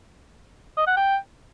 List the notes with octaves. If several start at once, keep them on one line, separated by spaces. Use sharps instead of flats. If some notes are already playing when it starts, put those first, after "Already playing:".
D#5
F#5
G5